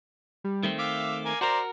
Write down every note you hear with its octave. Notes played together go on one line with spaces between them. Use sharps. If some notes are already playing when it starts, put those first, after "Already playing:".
G3
D#3 A3 C4
E5 F5 D6
A#3 G#5
F#4 A#4 C5 D5 A#5